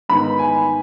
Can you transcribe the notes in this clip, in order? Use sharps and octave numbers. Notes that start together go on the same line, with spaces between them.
G#2 D#3 B3 D#4 B5
G#5